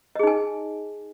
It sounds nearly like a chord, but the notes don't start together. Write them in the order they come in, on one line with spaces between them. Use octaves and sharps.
D#5 G#4 D#4 G#5